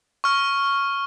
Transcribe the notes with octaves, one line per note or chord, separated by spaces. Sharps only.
C#6 F6